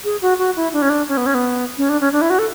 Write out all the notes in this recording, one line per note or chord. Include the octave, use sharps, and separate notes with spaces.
G#4
F#4
F#4
E4
D4
C#4
D4
C#4
B3
C#4
B3
C#4
D4
C#4
D4
E4
F#4
A4